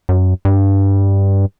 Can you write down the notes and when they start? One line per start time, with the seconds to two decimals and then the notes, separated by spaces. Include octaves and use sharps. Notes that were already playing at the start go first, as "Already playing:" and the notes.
0.09 F#2
0.45 G2